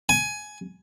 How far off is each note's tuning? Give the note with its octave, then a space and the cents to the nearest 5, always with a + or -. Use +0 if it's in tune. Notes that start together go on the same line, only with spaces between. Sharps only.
G#5 +15